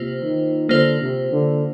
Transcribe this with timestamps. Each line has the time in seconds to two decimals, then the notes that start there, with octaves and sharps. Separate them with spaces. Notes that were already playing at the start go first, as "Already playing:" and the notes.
Already playing: C3 A#3 F4 C5
0.23 D#3
0.69 D3 A#3 F4 C5
1.01 C3
1.32 D3